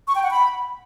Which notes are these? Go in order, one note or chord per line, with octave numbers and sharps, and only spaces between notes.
C#6
G5
F#5
B5